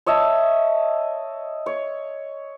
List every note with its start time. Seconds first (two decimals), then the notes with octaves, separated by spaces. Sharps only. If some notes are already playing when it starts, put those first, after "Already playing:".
0.06 C#5 D#5 E5 A5
1.66 C#5